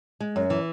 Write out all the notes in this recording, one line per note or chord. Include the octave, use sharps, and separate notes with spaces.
G#3
F#2
E3